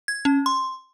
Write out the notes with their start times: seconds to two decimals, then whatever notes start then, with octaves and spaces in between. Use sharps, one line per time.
0.08 G#6
0.25 C#4
0.46 C6